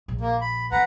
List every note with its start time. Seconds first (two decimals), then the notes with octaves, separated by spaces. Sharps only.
0.08 A#1
0.21 A#3
0.41 B5
0.72 F2 B4 F#5 A#5